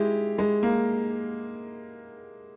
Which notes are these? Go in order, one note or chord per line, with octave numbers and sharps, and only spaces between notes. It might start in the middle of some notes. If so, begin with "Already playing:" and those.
Already playing: G#3 E4 G4
G#3
A#3